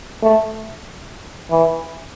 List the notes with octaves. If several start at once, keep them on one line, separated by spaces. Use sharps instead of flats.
A3
E3